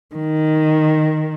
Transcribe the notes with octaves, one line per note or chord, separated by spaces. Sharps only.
D#3